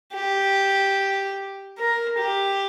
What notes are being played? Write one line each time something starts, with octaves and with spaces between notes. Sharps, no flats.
G4
A#4
G4